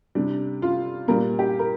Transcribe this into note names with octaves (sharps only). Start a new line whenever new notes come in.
C3 G3 D4
F4
A#2 G3 A#4
G4
A#4